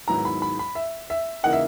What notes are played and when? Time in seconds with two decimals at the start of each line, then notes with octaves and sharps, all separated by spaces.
0.08 G#2 D#3 F#3 B3 E4 A#5
0.25 B5
0.42 B5
0.59 B5
0.75 E5
1.10 E5
1.43 C#3 E3 A#3 D#4 F#5
1.53 E5